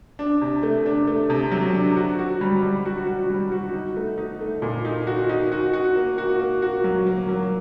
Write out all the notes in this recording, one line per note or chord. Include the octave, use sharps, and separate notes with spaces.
D4
C3
A3
D4
A3
C3
F#3
D4
F#4
F#4
G3
G3
F#4
F#4
G3
F#4
D#4
A3
D#4
A3
A#2
D#4
F#4
D#4
F#4
F#4
A#3
F#4
A#3
F#4
F#3
A#3
F#3